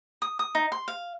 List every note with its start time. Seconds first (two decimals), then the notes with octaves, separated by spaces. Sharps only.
0.22 D#6
0.39 D#6
0.55 D#4
0.72 C6
0.88 F5